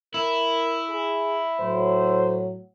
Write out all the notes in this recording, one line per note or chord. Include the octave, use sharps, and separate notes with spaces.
E4 A#4
G#4
A2 F#3 C5